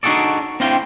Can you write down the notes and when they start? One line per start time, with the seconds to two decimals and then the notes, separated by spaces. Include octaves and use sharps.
0.03 D4 D#4 F#4 G#4 A4 D5
0.60 C4 D4 E4 F4 F5 G5